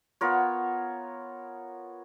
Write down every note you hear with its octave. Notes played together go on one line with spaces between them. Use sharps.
B3 F4 A#4 C#5